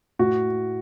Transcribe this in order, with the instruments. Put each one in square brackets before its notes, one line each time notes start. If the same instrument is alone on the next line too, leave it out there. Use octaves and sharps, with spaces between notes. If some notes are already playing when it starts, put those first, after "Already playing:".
[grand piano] A2 F#4